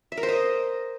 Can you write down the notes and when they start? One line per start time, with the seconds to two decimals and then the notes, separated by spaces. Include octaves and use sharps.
0.12 E5
0.17 A#4
0.23 C5
0.29 D#5